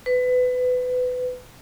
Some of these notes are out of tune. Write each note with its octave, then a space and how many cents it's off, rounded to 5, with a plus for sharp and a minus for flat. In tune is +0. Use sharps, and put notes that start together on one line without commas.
B4 +25